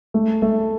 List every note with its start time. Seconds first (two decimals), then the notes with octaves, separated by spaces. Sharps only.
0.14 A3
0.42 A3